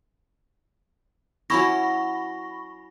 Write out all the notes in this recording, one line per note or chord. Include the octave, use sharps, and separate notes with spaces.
F#3 C#4 E4 B5 C#6 A#6